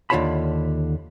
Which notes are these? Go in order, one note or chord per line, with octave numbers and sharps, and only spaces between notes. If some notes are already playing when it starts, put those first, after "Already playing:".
D#2 D3 F4 C#5 A5 B5